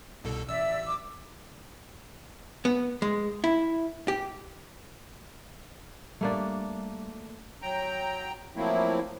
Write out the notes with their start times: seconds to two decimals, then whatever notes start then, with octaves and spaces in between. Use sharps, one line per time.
0.24 C2 B2 A4
0.49 A1 D5 E5 E6
0.86 D6
2.65 B3
3.02 G#3
3.44 E4
4.08 G4
6.21 G3 A3 A#3 D4
7.62 F#3 G5 A#5
8.56 F3 F#3 A3 A#3 C4 E4